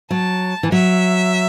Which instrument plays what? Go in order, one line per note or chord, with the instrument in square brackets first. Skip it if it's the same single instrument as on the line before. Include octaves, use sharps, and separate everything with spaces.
[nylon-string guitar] F#3 [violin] A5
[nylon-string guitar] E3
[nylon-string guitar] F#3 [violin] E5